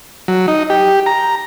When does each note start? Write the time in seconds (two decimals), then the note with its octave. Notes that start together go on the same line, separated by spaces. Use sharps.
0.28 F#3
0.48 D#4
0.70 G4
1.06 A#5